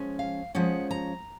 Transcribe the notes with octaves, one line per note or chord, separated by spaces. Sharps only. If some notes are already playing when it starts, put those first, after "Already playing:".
Already playing: F3 G#3 C#4
F5
F3 G#3 C#4 F#5
A#5